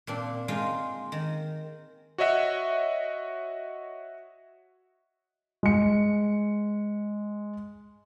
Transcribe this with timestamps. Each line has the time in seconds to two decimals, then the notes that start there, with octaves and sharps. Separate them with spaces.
0.07 A#2 C4 D4
0.48 G#3 D#4 F4
1.12 D#3
2.18 F#4 C#5 D#5 E5 F#5
5.63 G#3 C#7